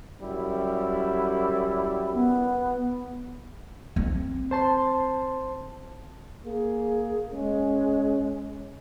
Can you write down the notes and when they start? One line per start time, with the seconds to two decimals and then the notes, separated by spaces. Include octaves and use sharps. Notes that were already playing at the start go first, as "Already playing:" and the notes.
0.21 F#2 G3 E4
2.14 B3
3.96 C4
4.51 C5 A5 C6
6.45 A#3 G#4
7.32 G#3 C#4